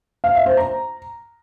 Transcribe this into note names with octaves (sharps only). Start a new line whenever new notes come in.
F5
E5
C5
A#5